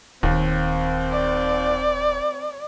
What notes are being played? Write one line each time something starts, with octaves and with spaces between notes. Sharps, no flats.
D#1 D#2 C4
D5